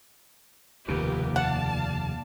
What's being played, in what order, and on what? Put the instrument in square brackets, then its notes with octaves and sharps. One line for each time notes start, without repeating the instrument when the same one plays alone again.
[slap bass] F1 C#3 [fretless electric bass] D#2 [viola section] G4 A#4 B4
[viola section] D5 F5 A5 [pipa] F#5